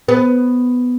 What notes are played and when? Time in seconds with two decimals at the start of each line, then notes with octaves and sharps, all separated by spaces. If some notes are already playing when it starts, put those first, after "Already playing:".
0.08 B3